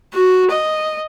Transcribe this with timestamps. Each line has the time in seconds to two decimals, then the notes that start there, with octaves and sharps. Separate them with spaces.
0.14 F#4
0.51 D#5